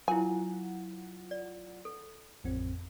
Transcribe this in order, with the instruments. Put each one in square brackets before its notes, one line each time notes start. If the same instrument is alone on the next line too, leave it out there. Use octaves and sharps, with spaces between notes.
[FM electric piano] F#3 F4 F#5 [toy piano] E4 A#4 [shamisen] G#5
[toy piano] D5
A4
[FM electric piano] A1 F2 C4